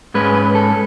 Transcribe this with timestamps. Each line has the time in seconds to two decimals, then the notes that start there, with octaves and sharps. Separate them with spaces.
0.14 G#2 G#3 C#4 B4
0.35 B4
0.55 A4